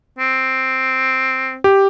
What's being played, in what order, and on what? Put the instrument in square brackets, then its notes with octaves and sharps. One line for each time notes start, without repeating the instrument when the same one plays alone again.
[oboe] C4
[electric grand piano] G4